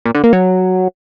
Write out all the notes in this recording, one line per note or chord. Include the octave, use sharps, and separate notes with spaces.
A#2
D3
A#3
F#3